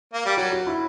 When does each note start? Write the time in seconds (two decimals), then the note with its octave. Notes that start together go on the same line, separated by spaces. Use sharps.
0.14 A#3
0.26 G3
0.37 F#3 F#4
0.52 F#4
0.67 E4